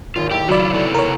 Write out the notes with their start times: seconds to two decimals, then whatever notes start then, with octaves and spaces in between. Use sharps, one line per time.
0.16 G#1 D#2 F4
0.31 A3 D#4 E4 G4 G5
0.49 C#3 F#3 E4 F4 D5 B5 A6
0.72 C3 B3 A4
0.94 A#4 C#5